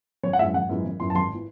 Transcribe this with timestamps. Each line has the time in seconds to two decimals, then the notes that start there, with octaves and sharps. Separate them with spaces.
0.23 G#1 C#5
0.33 F#5
0.39 F#2 E3 G#3 E5
0.54 G#1 F#5
0.69 F#2 E3 G#3
0.85 G#1
1.00 F#2 E3 C6
1.10 A5
1.15 G#1 C6
1.34 E3